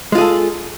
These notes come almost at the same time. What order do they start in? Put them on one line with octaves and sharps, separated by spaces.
G#3 F4 G#4 A4